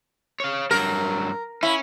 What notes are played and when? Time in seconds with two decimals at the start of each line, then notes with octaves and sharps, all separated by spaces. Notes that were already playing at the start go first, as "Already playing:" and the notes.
0.40 C#5 F5
0.71 G2 F#3 A#4
1.63 C#4 E4